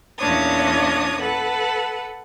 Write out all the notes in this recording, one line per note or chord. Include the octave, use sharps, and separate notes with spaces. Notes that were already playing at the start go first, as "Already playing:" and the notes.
E2 A#2 C#4 D4 C#5 D#6
A4 B4 F#5